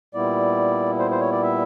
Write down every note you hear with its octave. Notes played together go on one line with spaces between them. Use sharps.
A#2 G3 B3 E4 D5
C5
C5
C#5
D5
E5